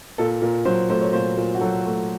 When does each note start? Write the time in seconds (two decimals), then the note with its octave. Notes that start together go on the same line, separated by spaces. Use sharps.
0.18 A#2 A4
0.42 A#2 A#4
0.65 F#3 C5
0.89 A3 C5
1.01 C#5
1.13 A#2 C5
1.37 A#2
1.54 F#4
1.61 F#3 A4
1.85 A3